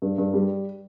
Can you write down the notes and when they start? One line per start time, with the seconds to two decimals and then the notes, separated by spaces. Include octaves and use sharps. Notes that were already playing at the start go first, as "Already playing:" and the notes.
0.02 G2
0.18 G2
0.34 G3